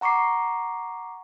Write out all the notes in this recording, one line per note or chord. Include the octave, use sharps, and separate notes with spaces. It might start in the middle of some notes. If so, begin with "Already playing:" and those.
F#5 A#5 C#6 D6 C7